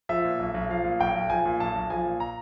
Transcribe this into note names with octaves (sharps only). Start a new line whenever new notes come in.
F3 E5
A#2
B1
B1
F3 F5
A#2
B1 G5
B1
F3 G#5
A#2
B1 A5
B1
F3 G#5
A#2
A#5